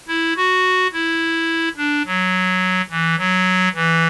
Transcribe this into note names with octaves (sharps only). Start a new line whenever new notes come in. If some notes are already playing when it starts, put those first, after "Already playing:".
E4
F#4
E4
D4
F#3
E3
F#3
E3